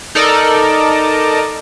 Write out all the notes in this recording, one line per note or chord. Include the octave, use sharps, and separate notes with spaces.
D#4 A4 A#4 D5